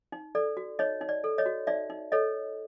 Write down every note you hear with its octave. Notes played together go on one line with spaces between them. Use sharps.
D#4
A4 D5
F#4
D#4 C#5 D#5
D#4
D5
A4
C#5 D#5
F#4
D#4 D5 E5
D#4
A4 C#5 D#5